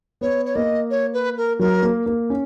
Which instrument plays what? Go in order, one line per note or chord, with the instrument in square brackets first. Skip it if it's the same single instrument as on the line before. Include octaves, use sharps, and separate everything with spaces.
[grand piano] B3 [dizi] C#5
[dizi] C#5
[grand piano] A#3 [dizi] D#5
[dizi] C#5
B4
A#4
[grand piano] F#3 [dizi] A#4
[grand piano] A#3
A#3
C#4